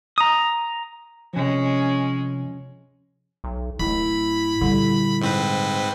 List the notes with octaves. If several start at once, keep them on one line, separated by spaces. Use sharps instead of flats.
A#5 D#6
C3 F3 G#3 C#4
B1
D1 A2 E4 B5
A#2 D3 G3
G#2 C4 B4